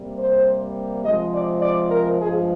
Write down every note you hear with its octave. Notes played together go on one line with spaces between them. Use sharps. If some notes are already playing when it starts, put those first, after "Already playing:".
Already playing: C3 G3 A#3
C5
C3 F3 G#3 D#5
D5
D5
A#4
G2 F3 G#3 G#4